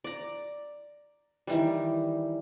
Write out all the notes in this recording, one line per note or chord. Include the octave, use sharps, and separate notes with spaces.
D5 A#5
D#3 E3 G3